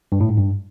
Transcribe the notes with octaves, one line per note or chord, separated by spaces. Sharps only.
G2
A2
G#2
G2